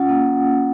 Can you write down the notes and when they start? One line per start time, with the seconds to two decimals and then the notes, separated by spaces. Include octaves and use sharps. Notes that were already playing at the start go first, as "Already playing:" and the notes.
Already playing: C#4 F4 F#5
0.09 A#3